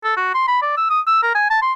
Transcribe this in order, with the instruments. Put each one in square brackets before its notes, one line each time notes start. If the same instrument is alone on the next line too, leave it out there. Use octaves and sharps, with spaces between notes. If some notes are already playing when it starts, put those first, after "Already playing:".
[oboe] A4
F#4
C6
B5
D5
E6
D#6
E6
A#4
G#5
A5
C6